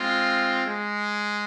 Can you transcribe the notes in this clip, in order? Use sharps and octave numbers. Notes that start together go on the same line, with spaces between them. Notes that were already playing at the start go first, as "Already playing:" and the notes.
Already playing: G#3 C4 F4
G#3